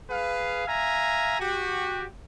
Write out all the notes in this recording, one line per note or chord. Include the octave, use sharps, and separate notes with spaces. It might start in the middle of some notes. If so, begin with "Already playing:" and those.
G#4 B4 F5
E5 F5 G#5 A#5
F#4 G4